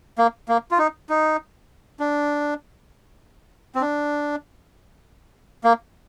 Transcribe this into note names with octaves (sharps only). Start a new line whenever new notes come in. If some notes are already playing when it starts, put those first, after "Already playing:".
A#3
A#3
F4
D#4
D#4
D4
C4
D4
A#3